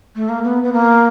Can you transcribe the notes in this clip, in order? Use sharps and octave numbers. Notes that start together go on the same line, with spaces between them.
A3
A#3
B3
B3
A#3